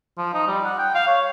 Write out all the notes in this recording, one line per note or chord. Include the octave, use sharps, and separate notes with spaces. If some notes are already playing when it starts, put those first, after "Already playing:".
F3
D#4
G3
F#5
G5
F5
C#5